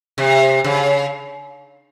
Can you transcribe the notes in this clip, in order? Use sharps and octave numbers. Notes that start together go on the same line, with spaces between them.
C3
C#3